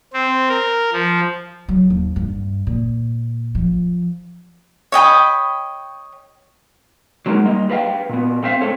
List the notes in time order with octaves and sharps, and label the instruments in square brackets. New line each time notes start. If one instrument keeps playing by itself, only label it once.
[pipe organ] C4
A#4
F3
[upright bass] F#3
D#2
G2
A#2
F3
[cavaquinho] C#5 D#5 G5 B5
[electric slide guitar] F#3 G#3 A#3 D#4 F#4 A#4
G3 A#3 D#5
G4 G#4 B4 D#5 F5 G5
A#2 B3
A3 C4 C5 E5 F5
A3 C4 A4 C#5